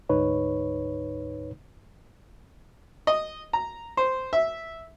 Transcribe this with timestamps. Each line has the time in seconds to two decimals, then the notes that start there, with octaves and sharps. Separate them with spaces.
0.09 D2 G#2 D#4 B4 C#5
3.07 D#5
3.53 A#5
3.97 C5
4.33 E5